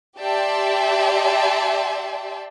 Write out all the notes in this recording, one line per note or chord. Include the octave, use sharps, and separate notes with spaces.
G4 D5 E5 G5 A5 C6